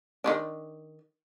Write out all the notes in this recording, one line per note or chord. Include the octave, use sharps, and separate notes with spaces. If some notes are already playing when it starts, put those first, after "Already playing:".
D#3 C#4 D4